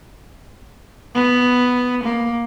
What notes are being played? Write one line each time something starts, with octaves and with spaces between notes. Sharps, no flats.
B3
A#3